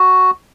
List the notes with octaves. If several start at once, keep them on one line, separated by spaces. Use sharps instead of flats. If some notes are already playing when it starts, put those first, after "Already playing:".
Already playing: F#4